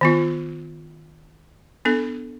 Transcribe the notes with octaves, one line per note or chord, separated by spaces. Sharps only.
D#3 B3 F4
B3 D4 A4